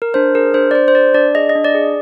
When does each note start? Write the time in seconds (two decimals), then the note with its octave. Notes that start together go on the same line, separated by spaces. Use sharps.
0.02 A#4
0.14 D4 C5
0.35 G#4 A#4
0.54 D4 C5
0.71 D5
0.75 D4 C5
0.88 C5
0.95 G#4 D5
1.14 D4 D5
1.35 G#4 D#5
1.49 D#5
1.55 D4
1.65 D5
1.75 G#4